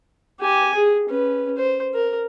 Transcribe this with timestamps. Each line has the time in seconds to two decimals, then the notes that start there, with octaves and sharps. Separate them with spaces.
0.40 G4 G#5
0.75 G#4
1.08 C#4 B4
1.57 C5
1.94 A#4